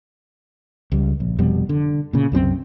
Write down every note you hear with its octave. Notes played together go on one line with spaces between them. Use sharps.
C#2 G3
A#1
F1 F2 B2 G3
D3
A#2 C#3
C2 F#2 E3 C4